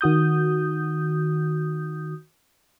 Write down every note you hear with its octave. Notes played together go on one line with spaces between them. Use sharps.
D#3 F#4 D#6 G6